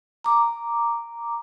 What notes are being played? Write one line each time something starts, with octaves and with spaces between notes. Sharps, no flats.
A#5 D6